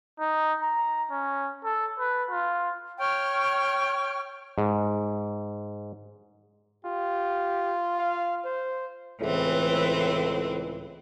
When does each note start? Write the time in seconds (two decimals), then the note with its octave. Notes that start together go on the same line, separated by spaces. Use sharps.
0.20 D#4
0.62 A#5
1.11 C#4
1.64 A4
1.99 B4
2.31 F4
2.99 C#5 G5 C#6 F6
4.58 G#2
6.85 F4 G4
7.99 F5
8.45 C5
9.20 C#2 A2 E3 C4